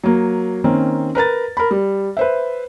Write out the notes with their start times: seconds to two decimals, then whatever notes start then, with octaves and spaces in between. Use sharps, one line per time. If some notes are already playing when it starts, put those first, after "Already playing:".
0.04 F#3 A#3
0.64 D#3 A#3 C4 C#4
1.15 A#4 B4 A#5 A6
1.57 A#4 B5
1.71 G3
2.17 B4 C5 E5